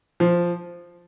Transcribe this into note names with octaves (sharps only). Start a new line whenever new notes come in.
F3